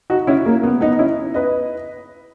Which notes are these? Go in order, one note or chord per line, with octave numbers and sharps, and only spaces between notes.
D#4 F#4
C#4 E4
A#3
B3
B3 D#4
C#4 E4
B4 D#5